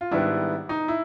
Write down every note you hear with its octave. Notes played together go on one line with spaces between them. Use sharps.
F4
G#2 D#3 G3 B3 D4 E4
D#4
E4